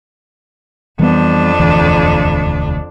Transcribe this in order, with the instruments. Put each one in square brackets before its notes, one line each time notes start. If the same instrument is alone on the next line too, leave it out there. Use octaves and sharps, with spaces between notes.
[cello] F2 D4 [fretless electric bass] E3 G3 B3
[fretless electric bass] E1 D2 E3